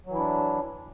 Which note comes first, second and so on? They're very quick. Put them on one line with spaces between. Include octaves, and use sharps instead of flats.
F#3 E3 E4 D4